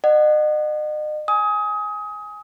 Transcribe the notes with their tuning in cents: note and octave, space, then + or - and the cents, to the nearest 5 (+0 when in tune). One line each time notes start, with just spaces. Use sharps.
D#5 -40 F#5 +0
G#5 +0 D#6 +25